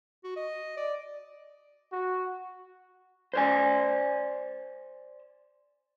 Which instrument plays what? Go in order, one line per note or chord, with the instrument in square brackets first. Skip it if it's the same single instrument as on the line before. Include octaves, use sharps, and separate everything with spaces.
[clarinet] F#4
D#5
D5
[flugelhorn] F#4
[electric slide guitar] C5 D5 G#5